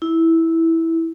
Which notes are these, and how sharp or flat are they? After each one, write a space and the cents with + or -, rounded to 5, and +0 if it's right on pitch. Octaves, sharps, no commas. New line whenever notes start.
E4 -10